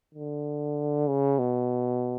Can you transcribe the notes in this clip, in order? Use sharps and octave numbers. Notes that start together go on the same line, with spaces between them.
D3
C#3
B2